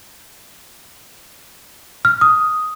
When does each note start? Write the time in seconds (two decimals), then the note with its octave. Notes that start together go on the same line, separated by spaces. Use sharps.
2.05 F6
2.21 D#6